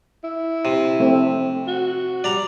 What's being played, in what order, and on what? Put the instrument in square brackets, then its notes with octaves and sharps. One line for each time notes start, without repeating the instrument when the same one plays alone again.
[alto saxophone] E4
[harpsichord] C3
[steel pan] A3 C4
[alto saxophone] F#4
[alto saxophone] G3 [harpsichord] D5 A#5